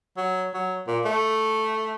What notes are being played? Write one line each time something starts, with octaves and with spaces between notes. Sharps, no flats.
F#3
F#3
A#2
A3